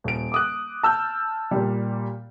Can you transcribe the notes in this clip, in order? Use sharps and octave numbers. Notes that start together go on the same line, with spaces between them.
D#1 D7
D6 D#6 F#6
A5 E6 F6 G6
A#2 G3